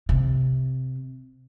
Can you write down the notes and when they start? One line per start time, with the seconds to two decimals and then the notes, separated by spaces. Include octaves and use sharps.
0.09 C3